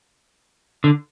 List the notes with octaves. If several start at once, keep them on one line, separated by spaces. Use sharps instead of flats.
D3